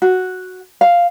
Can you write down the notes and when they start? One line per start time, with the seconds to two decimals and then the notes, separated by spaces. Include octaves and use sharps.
0.02 F#4
0.81 F5